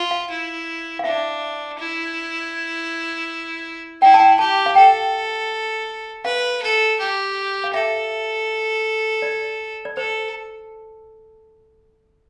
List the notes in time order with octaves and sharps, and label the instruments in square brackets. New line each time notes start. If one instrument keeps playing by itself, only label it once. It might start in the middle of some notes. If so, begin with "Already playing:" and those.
Already playing: [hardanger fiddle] F4
[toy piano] F5
[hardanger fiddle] E4
[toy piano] F5
[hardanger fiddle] D4 [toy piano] E5
[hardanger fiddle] E4
[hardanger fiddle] E4 [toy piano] G5
[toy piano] A5
G5
[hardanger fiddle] G4 [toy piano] A5
[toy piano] F5
[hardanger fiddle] A4 [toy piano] G5
[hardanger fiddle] B4 [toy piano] F5
[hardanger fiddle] A4
G4
[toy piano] F5
[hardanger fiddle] A4 [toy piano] E5
[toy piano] D5
D5
[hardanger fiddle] A4 [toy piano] C5